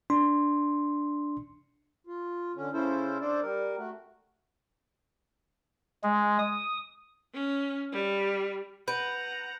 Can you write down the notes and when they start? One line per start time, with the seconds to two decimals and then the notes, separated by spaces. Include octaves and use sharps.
0.10 D4 C6
2.07 F4
2.56 D3 C#4
2.73 C#3 C#4 E4 A4 C5
3.21 D4 A4 C5 D5
3.42 G3 A#4
3.77 A3 F#4
6.03 G#3
6.39 D#6
7.34 C#4
7.92 G3
8.88 B4 F#5 A#5 G6 D7